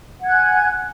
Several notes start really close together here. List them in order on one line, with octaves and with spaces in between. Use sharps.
F#5 G#6 F#6 G#5